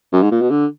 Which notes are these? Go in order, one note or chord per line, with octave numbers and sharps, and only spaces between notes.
F#2
G#2
A#2
B2
D3